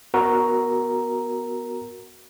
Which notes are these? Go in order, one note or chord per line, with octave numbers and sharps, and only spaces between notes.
B3 F#4 A#4 A#5